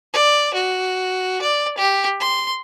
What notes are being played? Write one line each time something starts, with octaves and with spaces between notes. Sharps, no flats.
D5
F#4
D5
G4
C6